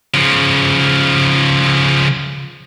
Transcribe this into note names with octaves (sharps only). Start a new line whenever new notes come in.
C#3 F3